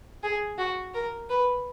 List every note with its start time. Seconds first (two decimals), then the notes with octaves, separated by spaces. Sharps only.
0.24 G#4
0.58 F#4
0.94 A#4
1.30 B4